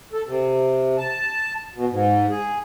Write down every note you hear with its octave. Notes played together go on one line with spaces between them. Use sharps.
A4
C3
A5
B2
G#2
G#4